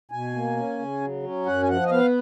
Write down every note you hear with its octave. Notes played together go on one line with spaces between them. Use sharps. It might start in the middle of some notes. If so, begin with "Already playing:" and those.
B2 G#5
A#3
C#4
C#3
F#3
C#4
F#2 F#5
G#5
F3 F#5
D#5
B3 F5